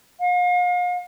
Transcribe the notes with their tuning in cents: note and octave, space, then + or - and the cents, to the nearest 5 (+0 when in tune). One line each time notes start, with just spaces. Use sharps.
F5 +40